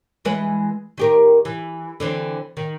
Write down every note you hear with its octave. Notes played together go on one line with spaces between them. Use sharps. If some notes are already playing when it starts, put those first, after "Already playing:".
E3 G#3 B4
D#3 G4 A#4
E3
D3 E3 C4
D#3